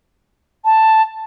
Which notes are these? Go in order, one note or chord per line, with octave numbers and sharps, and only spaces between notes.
A5